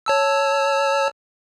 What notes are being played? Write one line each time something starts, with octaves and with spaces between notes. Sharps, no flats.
C#5 A5 E6